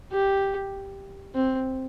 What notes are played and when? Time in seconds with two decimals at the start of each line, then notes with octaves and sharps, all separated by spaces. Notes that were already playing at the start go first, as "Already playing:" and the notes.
0.12 G4
1.35 C4